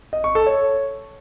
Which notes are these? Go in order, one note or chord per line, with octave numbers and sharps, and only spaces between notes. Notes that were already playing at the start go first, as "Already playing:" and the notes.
D#5
C#6
A4
C#5